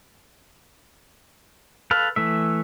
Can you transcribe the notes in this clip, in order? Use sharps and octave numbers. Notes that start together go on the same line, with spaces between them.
A4 B4 F5
E3 A3 E5